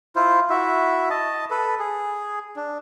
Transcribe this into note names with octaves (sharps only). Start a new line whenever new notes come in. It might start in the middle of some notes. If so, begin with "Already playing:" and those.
E4 F4 C5
E4 F#4 E5
D#5 A5
A4 B4
G#4
D4